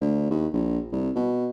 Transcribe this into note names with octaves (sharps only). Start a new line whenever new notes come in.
D2
D#2
A#1
C2
B2